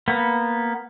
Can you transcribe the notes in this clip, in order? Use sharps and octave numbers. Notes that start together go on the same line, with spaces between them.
A#3 B3